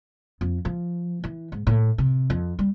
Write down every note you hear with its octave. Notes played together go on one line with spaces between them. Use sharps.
F2
F3
E3
G#2
A2
C3
F2
G3